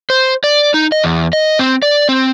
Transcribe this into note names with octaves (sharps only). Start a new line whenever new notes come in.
C5
D5
D#4
D#5
E2
D#5
C4
D5
C4